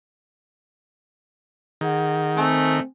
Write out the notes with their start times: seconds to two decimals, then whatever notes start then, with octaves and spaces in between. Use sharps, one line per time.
1.81 D#3 G#4 F#5
2.37 A3 C4 G#5